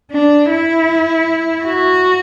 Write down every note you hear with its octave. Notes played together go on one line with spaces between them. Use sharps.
D4
E4
F#4